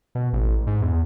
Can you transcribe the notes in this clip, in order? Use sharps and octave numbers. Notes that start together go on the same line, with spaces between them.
B2
A1
G#2
E2